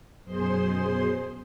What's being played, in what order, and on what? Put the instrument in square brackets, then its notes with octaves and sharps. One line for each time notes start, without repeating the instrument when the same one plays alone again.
[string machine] F#2 B2 G#4 C5 C6